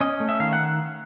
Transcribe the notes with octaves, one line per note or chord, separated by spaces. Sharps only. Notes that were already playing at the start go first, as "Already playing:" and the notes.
C#4 D#5
A3
E5
D#3 F5
F#5